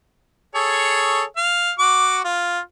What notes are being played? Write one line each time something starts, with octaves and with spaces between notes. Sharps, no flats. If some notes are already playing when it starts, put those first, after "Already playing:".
G#4 A4 C#5
F5
F#4 D6
F4